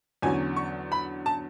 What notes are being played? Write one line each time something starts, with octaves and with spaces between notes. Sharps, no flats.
E2 D3 F#3 C#4 G#5
C#6
B5
A5